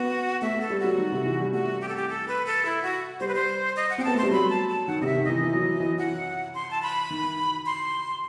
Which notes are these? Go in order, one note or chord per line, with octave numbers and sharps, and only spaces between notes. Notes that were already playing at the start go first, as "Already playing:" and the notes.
Already playing: B3 F#4
A3 E5
A3 A4
G3
F#3 F#4
D#3
C3
E3
G3
A3 F#4
G4
A4
G4
A4
B4
A4
E4
F#4
G3 C5
B4
C5
D#5
F#5
C4 G5
B3 A5
A3 C6
G3
F#3 B5
A5
A5
D#3 F#5
C3 D#5 E5
D#3
E3 D#5
E3
F#3
E3
E3
E3 F#5
C6
A5
B5
D#3
C6